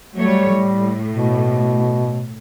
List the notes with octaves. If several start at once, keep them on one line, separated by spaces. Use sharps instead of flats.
F#3 G3 A3 C#5
A2
B2